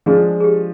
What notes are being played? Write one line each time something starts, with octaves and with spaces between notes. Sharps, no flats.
F3 G#3 D4 F4 G#4
G#4
G4